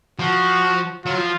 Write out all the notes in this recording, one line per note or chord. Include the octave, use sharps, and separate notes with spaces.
F3 F#4
F#3 F4
F3